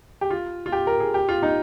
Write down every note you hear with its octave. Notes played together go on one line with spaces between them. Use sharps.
G4
F4
F4
G4
A#4
G#4
G4
F4
D#4